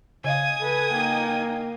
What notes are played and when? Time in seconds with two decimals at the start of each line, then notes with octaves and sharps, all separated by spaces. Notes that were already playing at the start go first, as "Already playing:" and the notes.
0.24 C#3 D#5 F5 G#5 D#6
0.59 A4 B4
0.91 A#3 D#4 G5